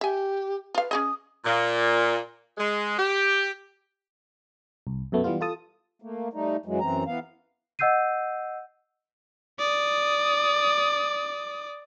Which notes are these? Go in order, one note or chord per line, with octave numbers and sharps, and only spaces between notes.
G4 E5 G#5
F4 B4 F5
C#4 G#4 D#5 D#6
A#2
G#3
G4
C2
F#2 B2 A3 B3
E3 G3 B3 F4
F4 A4 A5 D#6
A3 A#3
G3 A3 D#4
F#2 E3 F#3 G#3
F#2 E3 C4 A#5
E3 B3 F5
D#5 F#5 E6 G6 C7 D#7
D5 D#6